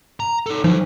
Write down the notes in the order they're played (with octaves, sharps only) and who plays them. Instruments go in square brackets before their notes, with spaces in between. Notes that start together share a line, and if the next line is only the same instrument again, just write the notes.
[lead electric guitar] A#5
D#4 A4
[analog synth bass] F3 [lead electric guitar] F#3 D#4